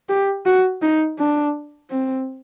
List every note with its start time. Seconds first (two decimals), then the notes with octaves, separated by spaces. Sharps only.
0.09 G4
0.46 F#4
0.82 D#4
1.19 D4
1.90 C4